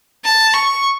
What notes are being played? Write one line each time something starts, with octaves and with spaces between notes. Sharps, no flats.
A5
C#6